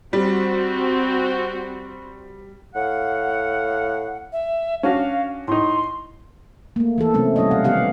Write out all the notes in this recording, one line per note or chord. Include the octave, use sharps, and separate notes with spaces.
G3 C4 F#4
A2 F5 F#5
E5
C#4 D4 F#4 F5
A2 D#4 C6
A3 A#3
E3 A#3 A4
C3 F#3 A3 C4 C#4
G3 C#4 E4 C#5 D#5
B2 F5 F#5
D#3 B3 G4 F5 F#5